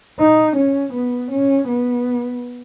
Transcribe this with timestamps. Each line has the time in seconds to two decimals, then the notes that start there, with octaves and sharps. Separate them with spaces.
0.19 D#4
0.56 C#4
0.93 B3
1.32 C#4
1.68 B3